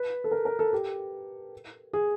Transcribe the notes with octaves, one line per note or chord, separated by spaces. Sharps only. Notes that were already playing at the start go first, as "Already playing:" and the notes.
Already playing: B4
A4
A#4
A#4
A4
G4
G#4